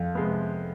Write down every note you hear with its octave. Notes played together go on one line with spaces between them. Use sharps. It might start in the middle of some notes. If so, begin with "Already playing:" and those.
Already playing: F2 F5
C3 G#3 B3